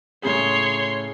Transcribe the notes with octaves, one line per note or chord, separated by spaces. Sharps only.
A2 C#3 G#4 C#5 C6